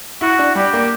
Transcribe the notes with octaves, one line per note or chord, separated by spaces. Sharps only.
E4 F#4
D4
G3 G4
A#3